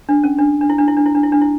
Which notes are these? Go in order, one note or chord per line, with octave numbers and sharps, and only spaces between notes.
D4
C#4
D4
D4
E4
D4
E4
D4
E4
D4
E4
D4
E4